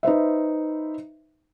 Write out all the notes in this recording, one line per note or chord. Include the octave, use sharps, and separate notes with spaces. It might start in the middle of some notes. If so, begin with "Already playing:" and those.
D#4 B4 C5 E5